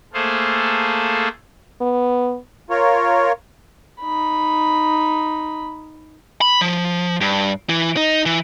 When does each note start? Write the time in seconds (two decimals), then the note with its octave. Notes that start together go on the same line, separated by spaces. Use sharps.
0.14 A3 A#3 G#4 A4 C5 F5
1.81 B3
2.70 F4 A#4 C#5
4.00 D#4 B5
6.41 B5
6.61 F3
7.21 G2
7.69 E3
7.97 D#4
8.26 E3